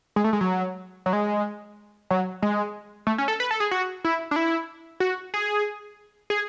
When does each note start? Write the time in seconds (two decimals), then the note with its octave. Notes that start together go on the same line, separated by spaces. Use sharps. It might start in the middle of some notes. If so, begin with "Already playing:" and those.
0.16 G#3
0.24 A3
0.33 G#3
0.41 F#3
1.06 F#3
1.13 G#3
2.11 F#3
2.42 G#3
3.07 A3
3.18 C#4
3.28 A4
3.40 B4
3.51 A4
3.60 G#4
3.71 F#4
4.04 E4
4.31 D4
4.36 E4
5.00 F#4
5.34 G#4
6.30 G#4